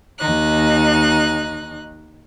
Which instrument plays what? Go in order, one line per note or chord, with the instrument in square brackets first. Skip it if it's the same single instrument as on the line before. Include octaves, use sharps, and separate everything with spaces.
[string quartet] D#2 D#4 F#6